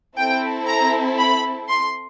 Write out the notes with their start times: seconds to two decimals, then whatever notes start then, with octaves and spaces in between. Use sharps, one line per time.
0.18 C4 E4 A4 G5
0.68 A#5
1.18 B5
1.69 C6